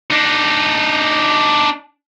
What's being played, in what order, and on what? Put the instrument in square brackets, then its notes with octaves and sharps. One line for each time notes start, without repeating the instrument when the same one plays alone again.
[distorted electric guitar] D4 D#4